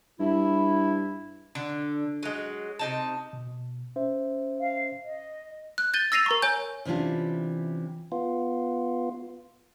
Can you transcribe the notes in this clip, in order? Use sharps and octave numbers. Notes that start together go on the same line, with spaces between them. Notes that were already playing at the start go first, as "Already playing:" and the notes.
G2 E4
D3
F#3 G#3
C3 D#4 A5
B2
C#4 C5 E5
F5
D#5
F#6
G6 A6 D#7 G7
E6 A6 A#6 C7 D#7 F7
A#4 A#5 C#6
C#5 G#5 G6
C3 E3 C#4 D4 F4
B3 F4